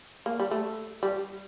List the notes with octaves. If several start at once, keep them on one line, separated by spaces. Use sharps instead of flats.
A#3
G3
A3
G3